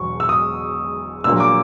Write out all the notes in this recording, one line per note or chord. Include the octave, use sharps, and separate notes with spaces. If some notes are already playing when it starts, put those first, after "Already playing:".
Already playing: E1 E2 B2 F#3 C#6
E6
D#6
A#1 A#2 F#3 A#3 E6
D6